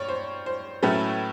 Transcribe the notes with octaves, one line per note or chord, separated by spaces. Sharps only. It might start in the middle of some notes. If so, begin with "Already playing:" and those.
Already playing: G2 C#5 D5
C5
C5
A2 F#3 A3 C#4 B4